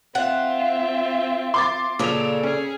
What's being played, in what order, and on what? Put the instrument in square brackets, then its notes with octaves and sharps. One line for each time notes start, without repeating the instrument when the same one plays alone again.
[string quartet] C4 F4 E5 [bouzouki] F#5
[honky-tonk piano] C6 D6 A6
[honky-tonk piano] A#2 F7 [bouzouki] C#3 D4 A4
[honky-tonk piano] C#4 [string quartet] G#4